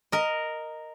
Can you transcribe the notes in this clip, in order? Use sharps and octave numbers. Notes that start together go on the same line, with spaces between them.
A#4 D#5